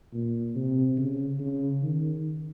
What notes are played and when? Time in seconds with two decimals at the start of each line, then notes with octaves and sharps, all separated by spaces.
0.13 A#2
0.55 C3
0.98 C#3
1.40 C#3
1.82 D#3